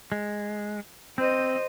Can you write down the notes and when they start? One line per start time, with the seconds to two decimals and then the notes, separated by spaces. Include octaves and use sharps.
0.12 G#3
1.18 C4 C5 D#5